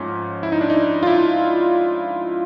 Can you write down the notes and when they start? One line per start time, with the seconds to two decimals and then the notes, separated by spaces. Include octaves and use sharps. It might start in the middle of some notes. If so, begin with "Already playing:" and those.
Already playing: G#2 F3 A3 C#4
0.43 E4
0.52 D#4
0.61 D4
0.70 D#4
1.03 F4
1.07 E4